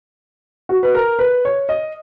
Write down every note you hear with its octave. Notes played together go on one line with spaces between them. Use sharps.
F#4
B4
A#4
B4
C#5
D#5